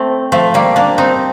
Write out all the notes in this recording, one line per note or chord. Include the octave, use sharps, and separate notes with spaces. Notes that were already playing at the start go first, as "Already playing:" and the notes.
Already playing: A3 C4
F3 A3
G3 A#3
A#3 D4
C4 D#4